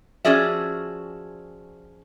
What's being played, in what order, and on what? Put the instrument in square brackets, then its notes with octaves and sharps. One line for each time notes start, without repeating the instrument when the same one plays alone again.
[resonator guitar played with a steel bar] F3 C#4 F#4 G#4 D5 E5